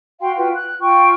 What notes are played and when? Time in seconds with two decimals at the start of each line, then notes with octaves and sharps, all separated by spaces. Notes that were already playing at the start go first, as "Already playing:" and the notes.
0.20 F#4 F5 G5 C6
0.37 F4 F#4 B4 G5
0.53 F#6
0.80 F4 G5 C#6